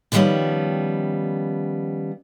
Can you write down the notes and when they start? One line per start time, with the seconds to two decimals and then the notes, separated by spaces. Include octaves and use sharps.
0.12 D3 D#3 F3 G3 B3 C#4